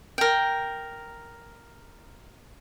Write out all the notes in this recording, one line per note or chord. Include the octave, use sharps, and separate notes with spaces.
A#4 G5